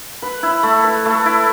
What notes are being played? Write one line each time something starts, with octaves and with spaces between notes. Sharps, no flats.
B4
E4
A3
B4
A3
E4